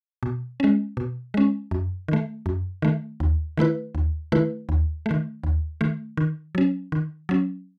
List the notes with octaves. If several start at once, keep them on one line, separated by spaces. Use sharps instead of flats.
B2
G#3 C#4
B2
G#3 C#4
F#2
D#3 A3
F#2
D#3 A3
D#2
D#3 A3 E4 B4
D#2
D#3 A3 E4 B4
D#2
D#3 A3
D#2
D#3 A3
D#3
F#3 C#4
D#3
F#3 C#4